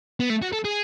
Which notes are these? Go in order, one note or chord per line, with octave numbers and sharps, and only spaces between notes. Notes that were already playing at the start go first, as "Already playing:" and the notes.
B3
A3
F#4
A4
G#4